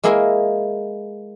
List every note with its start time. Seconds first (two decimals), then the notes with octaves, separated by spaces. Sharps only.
0.03 G#3 A#3 E4 G#4 A#4